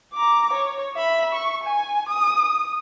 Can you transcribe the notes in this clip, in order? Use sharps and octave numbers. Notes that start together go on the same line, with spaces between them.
A#5 D6
C#5
E5 B5
C#6
G#5
D#6